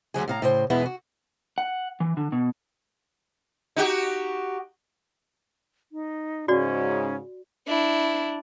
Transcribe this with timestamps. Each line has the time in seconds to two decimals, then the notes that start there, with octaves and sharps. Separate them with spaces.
0.14 D2 D#3 F#3 G#4
0.28 A2 F5 A#5
0.42 A2 C#3 C5
0.70 E2 B2 G#3 B3 E4
0.86 F#4
1.58 F#5
2.00 E3
2.17 D3
2.32 B2
3.76 D#4 F#4 G4
5.92 D#4
6.48 G#2 C#3 C#4 F#4 D5
7.67 D4 E4